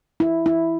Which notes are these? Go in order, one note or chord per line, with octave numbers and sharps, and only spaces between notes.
E4
E4